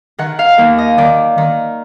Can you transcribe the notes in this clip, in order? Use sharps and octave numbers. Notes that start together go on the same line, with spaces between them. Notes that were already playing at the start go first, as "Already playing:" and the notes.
D#3 F#5
F5
D#2
D#5
D#3 D5
D#3